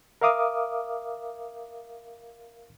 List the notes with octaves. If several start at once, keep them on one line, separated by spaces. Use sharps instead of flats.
A#4 E5 F5 D6 D#6